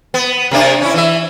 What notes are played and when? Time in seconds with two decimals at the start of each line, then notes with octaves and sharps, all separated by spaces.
0.14 B3
0.51 C3 A#3 D4
0.81 C#4 E4
0.94 E3 E5